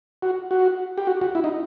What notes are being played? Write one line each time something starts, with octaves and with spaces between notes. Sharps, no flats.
F#4
F#4
G4
F#4
F#4
E4
D#4